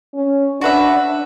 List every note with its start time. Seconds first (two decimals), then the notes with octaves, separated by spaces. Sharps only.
0.14 C#4
0.61 D4 F#4 B4 E5